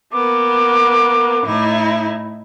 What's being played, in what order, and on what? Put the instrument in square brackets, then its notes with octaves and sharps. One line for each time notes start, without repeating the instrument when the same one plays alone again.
[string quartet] A#3 B3 [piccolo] D6
[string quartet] A2 D#4 E4